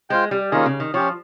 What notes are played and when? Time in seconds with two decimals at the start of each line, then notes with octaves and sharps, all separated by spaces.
0.10 G#3 F4 C5 G5
0.31 G3
0.51 D#3 A#3 C#4 F4 G#4
0.66 C#3
0.80 D#3
0.94 F3 C#4 G4 C#5